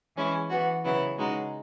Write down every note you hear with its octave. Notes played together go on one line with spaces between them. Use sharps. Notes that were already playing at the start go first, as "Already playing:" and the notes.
E3 G#3 C#4 E4
E3 B3 F#4
C#3 F#3 B3 E4
C#3 G#3 D#4 F#4